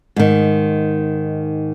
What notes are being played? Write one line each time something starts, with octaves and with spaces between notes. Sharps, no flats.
G#2 D#3